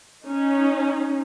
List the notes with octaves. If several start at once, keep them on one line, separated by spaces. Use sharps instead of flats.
C#4 D#4